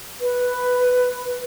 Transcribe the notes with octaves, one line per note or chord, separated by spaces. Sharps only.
B4